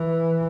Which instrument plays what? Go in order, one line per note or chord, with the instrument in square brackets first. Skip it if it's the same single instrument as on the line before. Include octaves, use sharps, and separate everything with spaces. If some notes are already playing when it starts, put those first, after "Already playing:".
Already playing: [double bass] E3